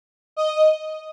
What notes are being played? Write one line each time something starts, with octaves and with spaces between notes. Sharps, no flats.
D#5